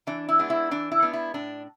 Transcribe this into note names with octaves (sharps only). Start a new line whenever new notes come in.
E3 D4
E4
G#3 B3 D4
E4
E3 D4
E4
G#3 B3 D4
E4
A2 D4